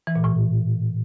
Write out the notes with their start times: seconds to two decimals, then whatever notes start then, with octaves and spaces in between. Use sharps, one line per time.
0.07 E3
0.16 A#2
0.24 A2